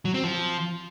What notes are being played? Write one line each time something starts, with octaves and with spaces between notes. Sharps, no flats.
F#3
C4
F3